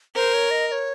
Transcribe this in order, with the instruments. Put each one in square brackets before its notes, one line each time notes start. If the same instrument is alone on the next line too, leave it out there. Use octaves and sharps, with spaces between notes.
[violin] A#4 [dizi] C5
[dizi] C#5
D#5
D#5
C#5